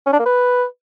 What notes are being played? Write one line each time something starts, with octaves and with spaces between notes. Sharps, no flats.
C#4
D4
A#3
B4